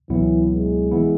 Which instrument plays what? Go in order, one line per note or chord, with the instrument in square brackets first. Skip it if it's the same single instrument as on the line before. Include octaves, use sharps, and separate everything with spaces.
[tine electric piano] C#2 B2 F#3 B3 E4 [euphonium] E3
[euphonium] G#3
[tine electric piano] E3 B3 E4